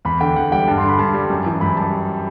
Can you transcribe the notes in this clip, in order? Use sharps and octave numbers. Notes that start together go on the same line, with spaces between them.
E2 B5
D3 G5
E2 F#5
G3 G5
G2 A5
C6
D3
B5
G2 A5
G3
F#2
E3
F#2 B5
G3 A5